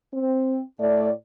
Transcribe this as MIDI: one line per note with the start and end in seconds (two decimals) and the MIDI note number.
0.14 0.60 60
0.79 1.10 45
0.79 1.10 57
0.79 1.10 74